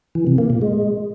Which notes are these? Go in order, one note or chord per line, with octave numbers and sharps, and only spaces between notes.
E3
C3
A#3
A#2
G#3